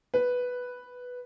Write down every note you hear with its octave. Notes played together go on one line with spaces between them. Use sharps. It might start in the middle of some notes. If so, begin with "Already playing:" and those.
B4